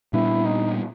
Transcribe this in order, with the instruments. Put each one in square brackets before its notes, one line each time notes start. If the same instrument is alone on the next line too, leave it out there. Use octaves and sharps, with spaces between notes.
[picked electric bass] A#2 G3 B3 D4 [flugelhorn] E4
[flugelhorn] D#4